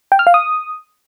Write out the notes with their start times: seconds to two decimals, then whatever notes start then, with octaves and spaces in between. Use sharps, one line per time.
0.12 G5
0.19 F6
0.27 F5
0.34 D#6